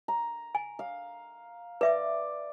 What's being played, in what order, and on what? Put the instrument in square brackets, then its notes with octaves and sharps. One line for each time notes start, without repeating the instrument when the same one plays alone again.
[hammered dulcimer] A#5
[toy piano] G#5
[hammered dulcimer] F5
[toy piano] B4 E5 D6 [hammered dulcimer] D5